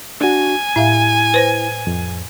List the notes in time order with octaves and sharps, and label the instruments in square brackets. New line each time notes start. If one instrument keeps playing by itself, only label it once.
[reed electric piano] D4 F#4 [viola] G#5
[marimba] A2 E5 F5 [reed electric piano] E4
[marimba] B4 C5 A#6
[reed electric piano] F2